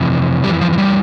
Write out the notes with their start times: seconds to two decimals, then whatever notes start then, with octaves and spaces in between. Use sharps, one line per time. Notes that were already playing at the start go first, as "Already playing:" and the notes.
Already playing: F2 C3 E3
0.44 F2 E3 G3
0.61 F3
0.73 F3
0.78 G3